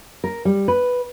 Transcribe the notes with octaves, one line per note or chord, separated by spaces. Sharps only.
A#4
G3
B4